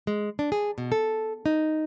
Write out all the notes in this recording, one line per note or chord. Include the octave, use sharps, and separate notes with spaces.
G#3
D4
G#4
B2
A4
D#4